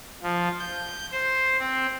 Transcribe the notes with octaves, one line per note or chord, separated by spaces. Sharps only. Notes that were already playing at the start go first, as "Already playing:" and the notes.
F3
G6
C5
C4